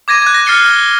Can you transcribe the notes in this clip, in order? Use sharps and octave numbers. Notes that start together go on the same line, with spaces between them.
D6 G#6 A#6 D#7
F#6 G#6
A#6
F6 A6 C7 C#7 G7
G7